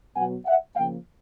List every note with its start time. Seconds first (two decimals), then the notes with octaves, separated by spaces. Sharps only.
0.15 B2 F#3 B3 F#5 G#5
0.46 E5 F#5
0.76 C#3 F3 A#3 F5 G5